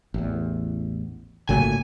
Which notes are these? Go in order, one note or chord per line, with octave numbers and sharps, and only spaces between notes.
A1 E2
G#1 A#2 C#3 F#3 A3 G#5